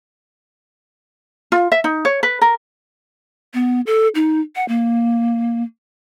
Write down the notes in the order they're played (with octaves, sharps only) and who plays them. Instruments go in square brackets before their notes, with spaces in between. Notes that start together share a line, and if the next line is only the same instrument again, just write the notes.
[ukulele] F4
E5
D#4
C#5
B4
A#4
[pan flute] B3
A4
D#4
F#5
A#3